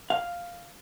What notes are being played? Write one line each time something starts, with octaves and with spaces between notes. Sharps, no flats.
F5